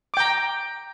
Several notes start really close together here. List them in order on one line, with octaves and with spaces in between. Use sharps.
D6 G5 A#5